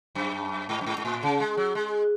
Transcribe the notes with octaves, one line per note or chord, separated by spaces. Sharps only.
F#2
G#2
F#2
G#2
G#2
A2
C#3
G#3
F#3
G#3